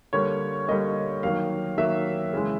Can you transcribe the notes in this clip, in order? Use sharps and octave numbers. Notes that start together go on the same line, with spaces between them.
D3 G3 A#3 C#5
D3 G3 A#3 D#5
D#3 F#3 A#3 F5
D#3 F#3 A#3 E5
C#3 E3 G#3